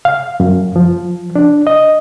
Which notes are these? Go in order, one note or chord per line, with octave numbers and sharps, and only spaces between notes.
F5
F#2
F3
D4
D#5